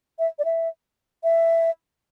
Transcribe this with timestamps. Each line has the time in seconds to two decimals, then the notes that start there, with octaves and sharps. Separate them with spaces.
0.19 E5
0.39 D5
0.45 E5
1.24 E5